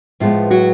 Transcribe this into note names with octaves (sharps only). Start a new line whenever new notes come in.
A2 F3 G#3 B3 F4
F#3 F#4